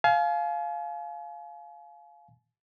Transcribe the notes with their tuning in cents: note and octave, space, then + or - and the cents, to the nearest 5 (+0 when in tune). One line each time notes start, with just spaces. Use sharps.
F5 +0 G#5 +40